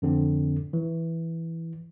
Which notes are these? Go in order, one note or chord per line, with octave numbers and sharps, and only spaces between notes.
F2 D3 C4
E3